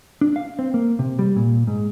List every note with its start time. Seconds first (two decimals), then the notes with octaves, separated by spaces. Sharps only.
0.21 D4
0.36 F5
0.59 C4
0.74 A#3
0.99 C3
1.19 G3
1.36 A#2
1.67 G#2